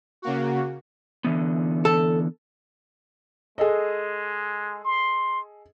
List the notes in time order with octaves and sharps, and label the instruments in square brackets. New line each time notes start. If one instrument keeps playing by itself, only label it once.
[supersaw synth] C#3 A#3 F#4
[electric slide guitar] D3 E3 B3
[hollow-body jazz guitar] A4
[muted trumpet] G#3 [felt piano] G#4 A4 D#5
[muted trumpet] C6